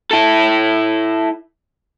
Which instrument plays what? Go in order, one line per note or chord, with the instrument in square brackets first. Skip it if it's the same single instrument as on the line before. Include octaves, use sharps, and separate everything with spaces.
[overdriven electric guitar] E4 A4